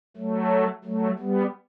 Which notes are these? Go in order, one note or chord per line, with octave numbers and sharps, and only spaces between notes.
F#3 A3
F#3 A3
G3 B3